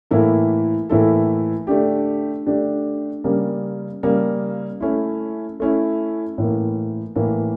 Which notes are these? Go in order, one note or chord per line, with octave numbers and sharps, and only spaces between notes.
A2 E3 A#3 E4 A4
A2 E3 A#3 E4 A4
D3 A3 D4 G4
D3 A3 D4 G4
C#3 G3 A#3
C#3 G3 A#3
A3 C#4 E4
A3 C#4 E4
A2 E3 A#3
A2 E3 A#3